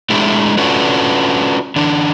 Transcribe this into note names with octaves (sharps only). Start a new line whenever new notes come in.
G#3 A3 D4 E4 G4 A4
C#4 D4 F4 F#4 A4 B4
D3 E3 D4